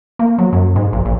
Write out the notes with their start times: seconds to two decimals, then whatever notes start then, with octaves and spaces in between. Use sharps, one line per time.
0.19 A#3
0.38 F#3
0.53 F#2
0.76 G#2
0.93 A#1
1.05 A#1